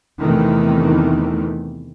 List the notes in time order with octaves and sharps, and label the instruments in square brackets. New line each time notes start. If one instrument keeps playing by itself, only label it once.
[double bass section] E2 C3 D#3 E3 A3